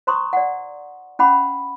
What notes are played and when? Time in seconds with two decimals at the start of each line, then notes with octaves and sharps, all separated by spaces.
0.07 C5 A#5 C6 C#6 D#6
0.33 D5 F#5
1.19 C#4 F#5 B5 D6